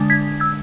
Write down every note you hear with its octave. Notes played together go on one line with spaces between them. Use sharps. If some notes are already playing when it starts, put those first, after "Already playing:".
Already playing: D3 G#3 D4
G#6 B6
E6 G#6